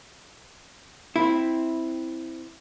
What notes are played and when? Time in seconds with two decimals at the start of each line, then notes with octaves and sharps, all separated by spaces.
1.16 C4 E4